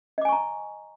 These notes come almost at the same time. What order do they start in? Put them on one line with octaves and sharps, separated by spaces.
D#5 D6 G#5 C#6 A#5